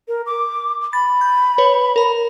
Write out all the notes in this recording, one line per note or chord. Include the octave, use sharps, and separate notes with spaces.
A#4
D6
B5 A6
G6
B4 C#5
A#4 A#5